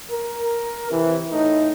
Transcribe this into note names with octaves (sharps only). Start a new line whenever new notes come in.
A#4
C3 E3
A2 A3 D#4